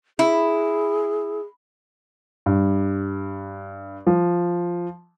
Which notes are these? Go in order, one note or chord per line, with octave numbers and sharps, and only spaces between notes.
E4 G#4
G2
F3